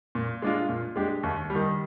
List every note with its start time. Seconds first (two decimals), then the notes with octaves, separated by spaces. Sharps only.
0.15 A#2
0.42 G#3 D4 F4
0.69 A#2
0.96 G#3 D4 G4
1.23 D#2
1.50 G3
1.55 D#3